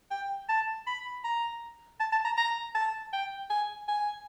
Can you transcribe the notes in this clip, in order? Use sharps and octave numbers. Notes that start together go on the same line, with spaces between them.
G5
A5
B5
A#5
A5
A5
A#5
A#5
A5
G5
G#5
G#5